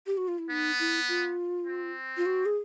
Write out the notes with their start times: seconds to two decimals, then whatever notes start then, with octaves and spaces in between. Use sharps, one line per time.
0.07 G4
0.17 F#4
0.28 F4
0.39 E4
0.50 B3 D#4
0.79 E4
1.08 F4
1.67 C4
2.17 F4
2.26 F#4
2.46 G#4